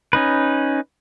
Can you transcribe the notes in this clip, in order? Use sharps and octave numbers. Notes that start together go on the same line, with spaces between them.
C#4 D#4 B4